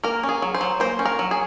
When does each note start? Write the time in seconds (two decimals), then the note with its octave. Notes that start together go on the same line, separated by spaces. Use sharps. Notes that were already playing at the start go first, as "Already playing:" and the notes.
0.04 A#3 A#4
0.23 C#4
0.29 G#4
0.42 F#3
0.55 C5
0.61 F#3
0.80 A#3 C5
0.99 C#4
1.05 A#4
1.19 F#3
1.31 G#4